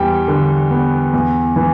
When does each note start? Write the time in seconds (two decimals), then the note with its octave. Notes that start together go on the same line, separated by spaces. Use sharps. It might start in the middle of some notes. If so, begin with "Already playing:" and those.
Already playing: E2 G3 G5
0.28 D3
0.71 B3
1.13 E2
1.56 E3